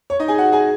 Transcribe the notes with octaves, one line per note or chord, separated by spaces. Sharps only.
C#5
D#4 D#5
G#4 G#5
F#4 F#5
G#4 G#5